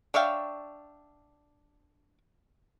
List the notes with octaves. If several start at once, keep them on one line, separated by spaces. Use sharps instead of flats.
D4 C#5 E5 F5 G5